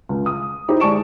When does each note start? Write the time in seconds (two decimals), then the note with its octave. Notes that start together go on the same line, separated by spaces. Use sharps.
0.09 C#2
0.26 D#6
0.68 D#4 E4 G4 C5
0.80 G#3 D5 A5 C#6 D7 E7